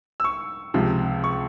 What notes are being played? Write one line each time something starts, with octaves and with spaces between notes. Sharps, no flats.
E6
C#6
C#2 C3 F3
C#6